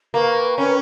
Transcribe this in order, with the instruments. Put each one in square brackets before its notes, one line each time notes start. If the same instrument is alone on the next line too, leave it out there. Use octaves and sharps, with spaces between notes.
[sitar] A#3 [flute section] B4 G5 C#6
[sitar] C#4